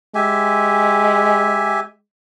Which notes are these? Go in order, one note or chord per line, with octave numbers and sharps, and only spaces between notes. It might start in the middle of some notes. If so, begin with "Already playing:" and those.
G#3 G4 E5 G#5